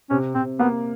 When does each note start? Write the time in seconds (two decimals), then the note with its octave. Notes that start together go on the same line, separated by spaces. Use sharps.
0.10 C3 C#4
0.35 C3 C4
0.59 A#3 B3